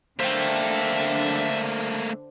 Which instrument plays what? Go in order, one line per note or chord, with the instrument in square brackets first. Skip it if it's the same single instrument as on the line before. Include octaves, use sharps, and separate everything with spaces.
[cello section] D3 D4 [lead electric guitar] A3 A#3 [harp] C5 G5 [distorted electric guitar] E5 A5